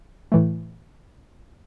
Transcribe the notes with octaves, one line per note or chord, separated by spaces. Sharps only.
A2 E3 A3